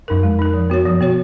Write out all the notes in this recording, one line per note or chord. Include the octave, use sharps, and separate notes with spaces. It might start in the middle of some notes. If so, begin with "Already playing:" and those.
F#2 D#4 A#4
F2 G#3
D#4 A#4
F3
B3 F#4 C#5
F#2 F3
B2 B3 F#4 C#5